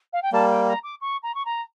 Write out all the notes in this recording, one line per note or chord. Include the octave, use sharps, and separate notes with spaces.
F5
G5
G3 A#3 A5
G5
A#5
D6
C#6
A#5
C#6
A#5